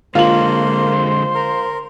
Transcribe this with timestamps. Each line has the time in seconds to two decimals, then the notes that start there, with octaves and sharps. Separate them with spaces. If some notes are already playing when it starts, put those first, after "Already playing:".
0.15 D3 G#3 A#3 F4 C5 F#7
1.35 A#4